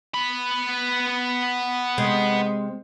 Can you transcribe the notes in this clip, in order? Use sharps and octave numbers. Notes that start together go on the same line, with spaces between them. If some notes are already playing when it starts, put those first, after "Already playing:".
B3 B5
C3 G#3